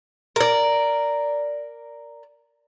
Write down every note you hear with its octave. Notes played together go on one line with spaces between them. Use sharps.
A#4 D5